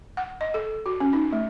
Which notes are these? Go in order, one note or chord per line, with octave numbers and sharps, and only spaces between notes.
F#5
D#5
A4
F#4
C#4
D#4
A3